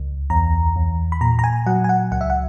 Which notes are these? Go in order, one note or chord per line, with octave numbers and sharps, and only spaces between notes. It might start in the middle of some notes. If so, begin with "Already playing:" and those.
Already playing: C#2
E2 A#5
E2
B5
A#2 A#5
A#5
G#5
F#3 F#5
G#5
F#5
C#2 F#5
E5
F#5